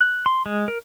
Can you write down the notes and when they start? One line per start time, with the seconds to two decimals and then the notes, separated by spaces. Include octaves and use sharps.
0.01 F#6
0.26 C6
0.46 G#3
0.68 A#4